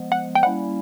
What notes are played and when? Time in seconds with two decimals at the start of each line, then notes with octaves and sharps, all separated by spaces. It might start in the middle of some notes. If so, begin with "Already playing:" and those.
Already playing: F3 G#3 B3
0.12 F#5
0.35 G5
0.43 G3 A#3 C#4 E4 F#5